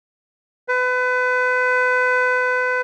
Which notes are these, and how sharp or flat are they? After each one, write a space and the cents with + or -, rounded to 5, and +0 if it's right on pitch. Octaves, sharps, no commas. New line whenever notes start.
B4 +30